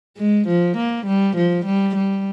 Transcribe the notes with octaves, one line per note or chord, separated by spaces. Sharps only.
G#3
F3
A#3
G3
F3
G3
G3